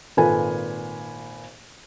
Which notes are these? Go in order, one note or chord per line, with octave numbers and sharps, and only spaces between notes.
G#1 A#2 A4 B4 G#5